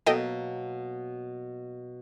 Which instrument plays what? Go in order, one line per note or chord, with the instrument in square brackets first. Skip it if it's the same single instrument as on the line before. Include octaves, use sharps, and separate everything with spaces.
[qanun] B2 F#3 A#3 [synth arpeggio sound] A4 D#5 G5